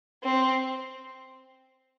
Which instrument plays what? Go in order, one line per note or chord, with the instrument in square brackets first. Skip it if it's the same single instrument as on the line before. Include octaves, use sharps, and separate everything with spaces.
[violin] C4